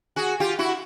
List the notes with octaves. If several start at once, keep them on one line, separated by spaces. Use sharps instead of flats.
F#4 G#4
F4 G4
E4 F#4